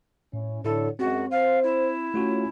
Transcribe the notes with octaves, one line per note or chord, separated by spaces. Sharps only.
A2 C#4 E4
A2 D3 E4 A4 C#5
F#2 G#3 C4 F#4
C5 F5
E4
A3 C#4 F4 F#4